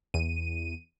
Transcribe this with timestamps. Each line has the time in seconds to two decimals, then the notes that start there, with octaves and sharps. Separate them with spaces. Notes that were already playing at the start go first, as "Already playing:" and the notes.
0.14 E2 D#7